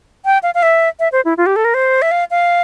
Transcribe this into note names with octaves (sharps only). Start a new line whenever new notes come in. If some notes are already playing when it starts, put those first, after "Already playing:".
G5
F5
F5
E5
E5
C5
E4
F4
G4
A4
A#4
C5
E5
F5
F5